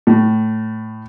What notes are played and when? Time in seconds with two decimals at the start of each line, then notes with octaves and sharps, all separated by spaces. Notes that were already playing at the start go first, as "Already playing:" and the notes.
0.07 A2